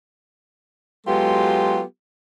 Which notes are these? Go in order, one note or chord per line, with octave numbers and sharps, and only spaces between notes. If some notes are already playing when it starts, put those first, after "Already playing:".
F#3 G#3 B3 F4 G4 A4